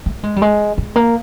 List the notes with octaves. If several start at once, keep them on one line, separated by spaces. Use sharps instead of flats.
A3
G#3
G3
G#3
G#3
A#3